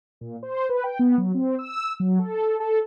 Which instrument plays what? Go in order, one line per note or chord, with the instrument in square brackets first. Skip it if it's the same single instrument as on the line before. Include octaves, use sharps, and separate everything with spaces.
[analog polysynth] A#2
C5
B4
G5
B3
F#3
C4
E6
F#3
A4
A4